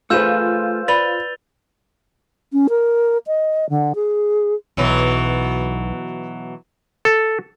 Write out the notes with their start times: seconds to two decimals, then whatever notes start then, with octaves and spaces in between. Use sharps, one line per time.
0.10 A3 F4 G#4 B4 C5 E6 G6 E7
0.88 B4 D5 B5 A6 F7 G7
2.53 C#4
2.69 A#4
3.27 D#5
3.69 D3
3.95 G#4
4.77 B1 B2 E3 F#3
7.05 A4